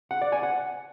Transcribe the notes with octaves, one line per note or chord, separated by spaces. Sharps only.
F#5
D5
G#5
F#5